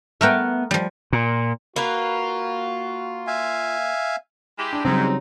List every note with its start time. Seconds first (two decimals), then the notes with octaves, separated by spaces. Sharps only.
0.21 A3 B3 A#4 E5 G5
0.71 F3 G3
1.13 A#2
1.76 A#3 F4 F#4 B4
3.27 E5 F5 G#5
4.58 G#3 E4 G4
4.73 D4
4.85 G#2 C#3 F#3 G3 C4 D#4